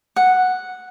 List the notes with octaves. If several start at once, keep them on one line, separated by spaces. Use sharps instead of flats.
F#5